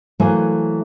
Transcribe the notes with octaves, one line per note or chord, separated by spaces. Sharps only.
E3 F#3 A3 A#3 C5 G#5